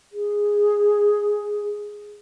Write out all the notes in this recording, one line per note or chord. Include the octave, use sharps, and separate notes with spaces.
G#4